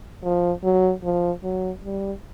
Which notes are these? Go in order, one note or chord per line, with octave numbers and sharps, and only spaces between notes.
F3
F#3
F3
F#3
G3